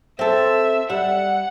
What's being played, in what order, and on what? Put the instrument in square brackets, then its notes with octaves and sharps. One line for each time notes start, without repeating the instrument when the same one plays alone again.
[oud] C4 A4 [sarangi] E5
[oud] G3 E5 [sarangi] F#5